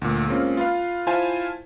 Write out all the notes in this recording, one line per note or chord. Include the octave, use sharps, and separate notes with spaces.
D2 A#2
G#3 A#3 C4 C#4 F4
F4 B4 F5
E4 F4 C5 F5 G#5 A5